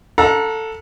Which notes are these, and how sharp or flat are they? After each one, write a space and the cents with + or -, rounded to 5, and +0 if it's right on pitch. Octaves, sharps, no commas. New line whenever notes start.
A4 +10 F#5 -40 A#5 +20